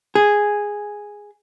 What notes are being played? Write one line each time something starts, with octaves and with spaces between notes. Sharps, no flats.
G#4